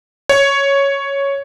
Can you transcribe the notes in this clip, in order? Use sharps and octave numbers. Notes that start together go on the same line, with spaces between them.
C#5